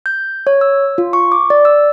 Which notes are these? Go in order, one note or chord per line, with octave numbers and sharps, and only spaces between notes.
G6
C#5
E6
F4
C#6
D6
D5
E6